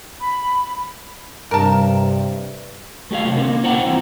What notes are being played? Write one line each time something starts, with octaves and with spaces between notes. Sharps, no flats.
B5
G2 C3 A#4 A5
A3 G4 G#4 F5
C3 E3 F#3 A3
D3 C4 C#4 A#4
A#3
E4 C5 F#5 G5 A#5
E3 C4 E4